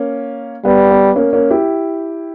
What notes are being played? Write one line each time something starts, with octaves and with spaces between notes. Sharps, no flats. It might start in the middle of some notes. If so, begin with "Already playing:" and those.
Already playing: A#3 C#4
G3 B3
B3
A#3 C#4
A#3 C#4
E4 G4